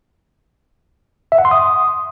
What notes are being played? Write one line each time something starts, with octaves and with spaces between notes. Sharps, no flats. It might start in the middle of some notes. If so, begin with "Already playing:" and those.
E5
F#5
C6
D#6